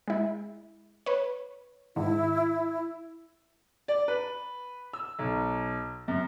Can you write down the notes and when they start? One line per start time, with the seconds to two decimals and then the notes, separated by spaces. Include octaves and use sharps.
0.08 G#3 E4
1.06 B4 C#5
1.96 G#2 D#3 E4
3.88 D5
4.08 B4
4.93 E6
5.19 B1
6.08 F#2